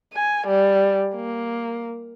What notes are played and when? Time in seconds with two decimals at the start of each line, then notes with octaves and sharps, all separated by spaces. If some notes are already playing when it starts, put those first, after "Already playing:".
0.14 G#5
0.47 G3
1.15 A#3